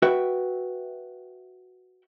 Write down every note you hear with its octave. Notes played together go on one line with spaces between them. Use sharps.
F#4 B4 E5 G5